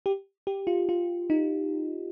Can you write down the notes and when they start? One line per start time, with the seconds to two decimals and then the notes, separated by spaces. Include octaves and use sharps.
0.06 G4
0.47 G4
0.67 F4
0.89 F4
1.30 D#4